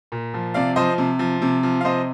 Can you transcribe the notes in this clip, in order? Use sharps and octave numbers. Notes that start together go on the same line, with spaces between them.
A#2
F3
C3 D5 F5
F3 C5 D#5
C3
F3
C3
F3
F5
C3 C5 D#5